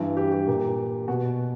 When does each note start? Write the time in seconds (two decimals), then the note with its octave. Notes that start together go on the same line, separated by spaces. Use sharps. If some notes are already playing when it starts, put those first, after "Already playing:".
Already playing: G2 E3
0.17 G4
0.32 G4
0.47 A#2
1.08 B2 F#4